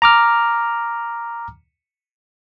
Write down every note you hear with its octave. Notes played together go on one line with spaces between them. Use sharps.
A#5 D6 F6